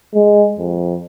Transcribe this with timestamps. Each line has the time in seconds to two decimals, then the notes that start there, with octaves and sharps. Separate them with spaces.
0.14 G#3
0.59 F2